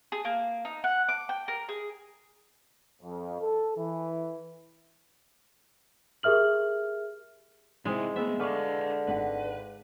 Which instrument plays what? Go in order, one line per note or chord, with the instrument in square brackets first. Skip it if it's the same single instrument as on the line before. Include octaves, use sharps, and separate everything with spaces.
[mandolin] G#4
A#3
D#4
F#5
D6
G5
A#4
G#4
[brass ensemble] F2
A4
E3
[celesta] G4 G#4 A#4 E5 F6 F#7
[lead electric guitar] C3 E4 [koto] G#3 [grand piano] C4 D#4
[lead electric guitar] F2 A3 [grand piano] B3 G#4 [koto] E5
[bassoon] D3 [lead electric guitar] B4 F5 [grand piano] C#6 D6 F6
[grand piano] G#1 D#3 F#5 [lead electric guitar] B4